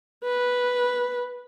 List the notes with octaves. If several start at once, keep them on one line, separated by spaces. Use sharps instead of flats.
B4